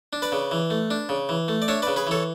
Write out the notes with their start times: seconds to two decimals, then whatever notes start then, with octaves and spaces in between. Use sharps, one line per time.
0.13 D4
0.22 B4 D5
0.32 C#3
0.51 E3
0.70 A3
0.91 D4
1.09 C#3
1.29 E3
1.48 A3
1.62 D5
1.68 D4 C#5 E5
1.82 C#3 B4 D5
1.96 G#4 B4
2.07 E3 A4 C#5